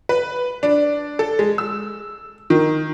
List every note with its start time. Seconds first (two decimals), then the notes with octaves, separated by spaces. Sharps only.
0.09 B4
0.63 D4
1.19 A4
1.39 G#3
1.58 E6
2.50 D#3